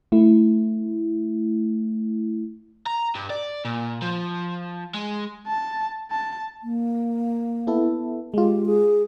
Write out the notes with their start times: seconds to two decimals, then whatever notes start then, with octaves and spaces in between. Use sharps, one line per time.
0.12 A3 E4
2.86 A#5
3.15 G2
3.30 D5
3.65 A#2
4.02 F3
4.94 G#3
5.47 A5
6.11 A5
6.62 A#3
7.67 B3 E4 A4
8.34 G#3 F4 G4
8.66 G#4